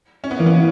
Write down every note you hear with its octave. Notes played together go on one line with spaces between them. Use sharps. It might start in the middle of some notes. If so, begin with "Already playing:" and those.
C#4
B3
E3 A#3
B3
C#4